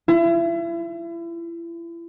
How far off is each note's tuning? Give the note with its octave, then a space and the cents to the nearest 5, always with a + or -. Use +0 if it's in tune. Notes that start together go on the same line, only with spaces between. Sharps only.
E4 +35